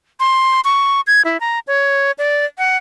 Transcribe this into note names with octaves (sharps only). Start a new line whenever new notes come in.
C6
C#6
G#6
E4
A#5
C#5
D5
F#5